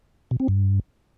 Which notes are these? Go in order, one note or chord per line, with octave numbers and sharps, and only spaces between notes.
B2
C4
G2